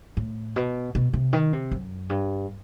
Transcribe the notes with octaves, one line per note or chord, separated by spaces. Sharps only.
A2
B2
B2
C3
D#3
C3
F#2
G2